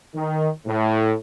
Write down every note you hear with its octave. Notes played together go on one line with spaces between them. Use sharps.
D#3
A2